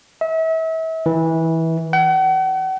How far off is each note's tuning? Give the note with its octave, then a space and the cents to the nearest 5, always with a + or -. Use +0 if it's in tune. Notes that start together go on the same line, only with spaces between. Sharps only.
E5 -35
E3 -20
F#5 +40